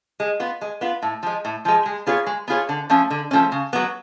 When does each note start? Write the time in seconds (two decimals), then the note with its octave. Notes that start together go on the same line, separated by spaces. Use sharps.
0.20 G#3
0.40 B3 F4
0.61 G#3
0.81 B3 F4
1.02 A2
1.23 F3 G#3
1.45 A2
1.65 F3 G#3
1.86 G#3
2.07 B3 F4 G#4 C#5
2.26 G#3
2.48 B3 F4 G#4 C#5
2.69 D3
2.90 F3 A3 C#4
3.10 D3
3.31 F3 A3 C#4
3.52 C#3
3.73 F#3 B3